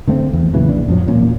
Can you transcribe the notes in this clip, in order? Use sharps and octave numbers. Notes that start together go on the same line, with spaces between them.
D3 A3 B3 C4
E2
A#2 C#3 E3 F#3
A#1 D4
F2 A2 F3 F#3
E1 A#2 C#4